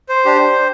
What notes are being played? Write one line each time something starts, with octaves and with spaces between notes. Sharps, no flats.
C5
D4 G4